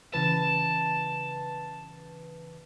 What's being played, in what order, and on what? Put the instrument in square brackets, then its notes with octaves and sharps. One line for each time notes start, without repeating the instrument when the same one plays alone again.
[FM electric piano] C#3 E3 B4 [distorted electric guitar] A5